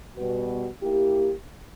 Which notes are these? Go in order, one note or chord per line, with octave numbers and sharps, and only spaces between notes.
B2 G3 B3 F#4 B4
A#3 E4 G4